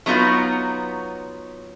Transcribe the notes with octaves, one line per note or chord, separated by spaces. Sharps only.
F#3 B3 D#4 F4 F#4